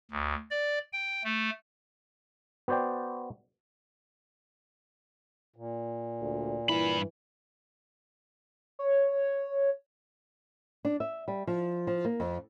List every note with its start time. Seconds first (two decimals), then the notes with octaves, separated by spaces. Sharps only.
0.11 D2
0.51 D5
0.93 G5
1.24 A3
2.68 B3 F#4 C5 D5 G5
5.56 A#2
6.21 D2
6.69 G2 E3 E4 B5
8.79 C#5
10.85 D4
11.00 E5
11.28 G3
11.47 F3
11.87 F3
12.05 A#3
12.20 F2